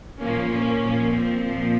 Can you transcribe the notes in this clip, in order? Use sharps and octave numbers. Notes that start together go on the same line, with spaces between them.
A#2 F3 A#3 C#4
A#3 C#4
A#2 F3
C4
A#2 F3